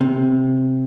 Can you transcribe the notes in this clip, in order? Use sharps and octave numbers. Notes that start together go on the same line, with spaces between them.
C3